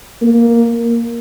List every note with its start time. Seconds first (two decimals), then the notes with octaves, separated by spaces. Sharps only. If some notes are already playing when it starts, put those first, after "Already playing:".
0.22 A#3